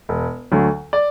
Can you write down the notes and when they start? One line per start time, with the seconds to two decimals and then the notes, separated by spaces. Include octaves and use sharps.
0.09 E1
0.51 D2 D3 F#3
0.93 D5